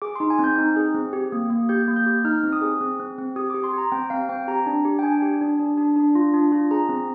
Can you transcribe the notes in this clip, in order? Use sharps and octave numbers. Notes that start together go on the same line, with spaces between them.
G#4 D6
C6
D#4
G#5
C4 G6
D#4
G#4
C4
G4
A#3
A#3
G4 G6
A#3
G6
G4
D#4 F6
C4
D#6
G#4
C4
C4
C4
G4 D#6
D6
G4
C6
G4 A#5
C4 G5
C4 F5
C4 G5
G4 A#5
D4
G4
G5
D4 G#5
G4
D4
D4
D4
D4
F4
D4
F4
G#4 A#5
C4